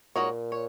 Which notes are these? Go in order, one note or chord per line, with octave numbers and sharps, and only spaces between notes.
A#2 G#3 D#4 F#4 A#4 C#5
C#5